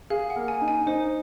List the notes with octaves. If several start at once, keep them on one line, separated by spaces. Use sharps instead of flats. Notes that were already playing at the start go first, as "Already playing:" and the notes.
G#4 F5
F#5
A#3
G#5
D#4
G#5
D#4 C5